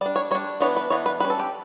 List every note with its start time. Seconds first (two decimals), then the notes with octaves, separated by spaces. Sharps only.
0.01 G3 D5
0.06 D4
0.16 C#5
0.31 G3 C#5
0.35 D4
0.60 E3 B3 D4 C#5
0.77 B4
0.90 E3 B3 D4 C#5
1.06 B4
1.20 G3 C#4 B4
1.30 A4
1.40 G4